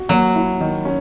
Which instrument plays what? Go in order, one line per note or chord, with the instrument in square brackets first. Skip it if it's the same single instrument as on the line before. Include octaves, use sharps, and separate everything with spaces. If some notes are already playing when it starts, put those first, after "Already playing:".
Already playing: [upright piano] F#4
[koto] F#3 [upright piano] A#3
[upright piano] E4
D#3
C#4